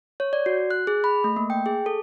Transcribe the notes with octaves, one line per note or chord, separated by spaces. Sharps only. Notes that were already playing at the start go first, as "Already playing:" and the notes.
C#5
D5
F#4
F#6
G#4
B5
A3
A#3
G5
G#4
A4